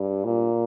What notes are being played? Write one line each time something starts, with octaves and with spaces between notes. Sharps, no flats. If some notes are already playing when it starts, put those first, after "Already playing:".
Already playing: G2
A#2